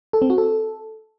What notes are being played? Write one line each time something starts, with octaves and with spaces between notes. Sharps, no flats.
A4
C4
F#4
A4